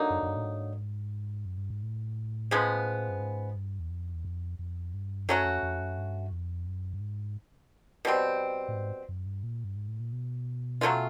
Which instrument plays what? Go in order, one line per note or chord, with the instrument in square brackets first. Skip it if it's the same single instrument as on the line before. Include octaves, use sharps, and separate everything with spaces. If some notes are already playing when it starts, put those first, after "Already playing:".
Already playing: [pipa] D3 F#3 A#3 D#4
[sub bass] F#2
F#2
G2
A2
G#2
F#2
G2
G#2
A2
[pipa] C#3 F3 G#3 B3
[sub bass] G2
G#2
G2
E2
F2
E2
F2
F2
G2
[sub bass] F#2 [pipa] F#3 A3 C#4 F#4
[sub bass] F2
F2
F#2
G2
F2
F#2
G2
G#2
[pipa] B2 G3 C4
[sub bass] A2
G#2
F#2
G2
A#2
G2
G#2
A2
A#2
B2
[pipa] F#3 A3 C#4 F4